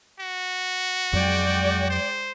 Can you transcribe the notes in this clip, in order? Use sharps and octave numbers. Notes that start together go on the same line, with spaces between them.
F#4
F2 F#3 G#3 D5 G5
C5